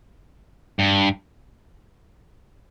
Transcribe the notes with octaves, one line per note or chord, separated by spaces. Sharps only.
G2